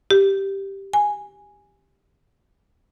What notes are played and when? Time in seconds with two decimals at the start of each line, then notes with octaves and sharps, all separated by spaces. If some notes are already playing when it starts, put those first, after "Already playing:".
0.10 G4
0.93 G#5